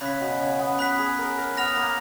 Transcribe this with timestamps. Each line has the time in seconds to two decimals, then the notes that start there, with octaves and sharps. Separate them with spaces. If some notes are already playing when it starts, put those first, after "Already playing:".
0.01 C#3 B5 F#6 B6
0.21 B2
0.40 C#3
0.59 B3
0.79 B3 B5 F#6 B6
0.98 G#4
1.19 A#4
1.38 A#4
1.57 B3 F6 A#6 F7
1.76 A#3